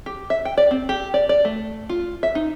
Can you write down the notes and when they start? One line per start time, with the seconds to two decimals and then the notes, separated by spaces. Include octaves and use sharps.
0.06 G4
0.30 E5
0.45 G5
0.58 D5
0.71 C4
0.89 G4
1.14 D5
1.29 D5
1.45 A3
1.89 F4
2.23 E5
2.35 D#4